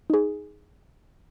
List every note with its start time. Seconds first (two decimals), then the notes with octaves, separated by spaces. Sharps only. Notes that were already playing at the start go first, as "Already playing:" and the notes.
0.10 D#4 G#4